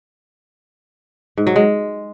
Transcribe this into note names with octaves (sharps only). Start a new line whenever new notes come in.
G#2
F#3
G#3